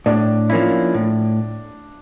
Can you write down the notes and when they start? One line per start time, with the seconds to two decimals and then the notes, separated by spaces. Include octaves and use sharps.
0.06 A2 D4
0.50 F3 A#3 C#4 E4
0.94 A2